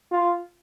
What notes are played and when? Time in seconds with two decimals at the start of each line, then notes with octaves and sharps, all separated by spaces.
0.11 F4